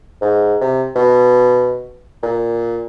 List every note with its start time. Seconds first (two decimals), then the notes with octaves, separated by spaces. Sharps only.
0.21 G#2
0.61 C3
0.96 B2
2.23 A#2